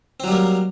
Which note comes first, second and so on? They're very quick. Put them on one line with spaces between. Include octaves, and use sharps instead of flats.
C4 F#3 G3 A#3